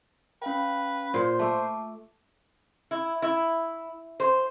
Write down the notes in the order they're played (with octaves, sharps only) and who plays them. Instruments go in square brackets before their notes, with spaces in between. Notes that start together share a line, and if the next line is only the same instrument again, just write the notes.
[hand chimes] C#4 F5 G5 [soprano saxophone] B4
[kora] A#2 [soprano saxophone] C5
[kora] A3 [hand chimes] A5 D6
[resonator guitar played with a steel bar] E4
E4
C5